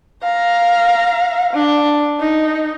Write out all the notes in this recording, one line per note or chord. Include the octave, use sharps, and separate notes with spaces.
F5 A#5
D4
D#4